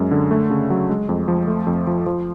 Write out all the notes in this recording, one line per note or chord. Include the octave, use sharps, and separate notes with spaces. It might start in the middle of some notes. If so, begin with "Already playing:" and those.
Already playing: F#2 G#3
D3
A3
C#3
F#3
G#3
F2
F3
A3
F2
F3
F3